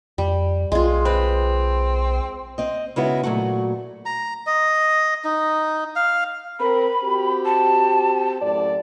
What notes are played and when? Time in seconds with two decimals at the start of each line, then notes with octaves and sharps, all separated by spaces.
0.18 F2 G3
0.72 B1 G#3 F4
1.05 C4 B4
2.58 C4 D#5
2.96 C#3 G#3 B3 D#4 E4 F#4
3.23 A#2 F#3 A3 F#4
4.06 A#5
4.47 D#5
5.24 D#4
5.96 F5
6.60 C4 A#4 B5
7.03 C4 F#4 G4
7.45 A5
8.41 F#2 A2 D5